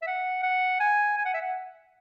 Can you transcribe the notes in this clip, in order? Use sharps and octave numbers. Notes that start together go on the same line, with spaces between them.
E5
F#5
F#5
G#5
G#5
F#5
E5
F#5